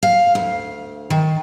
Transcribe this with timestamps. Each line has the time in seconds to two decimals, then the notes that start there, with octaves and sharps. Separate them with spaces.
0.03 F5
0.35 D2
1.10 D#3